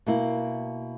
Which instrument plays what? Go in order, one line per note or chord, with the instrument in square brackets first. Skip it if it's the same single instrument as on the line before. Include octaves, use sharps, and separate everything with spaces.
[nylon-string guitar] B2 A#3 E4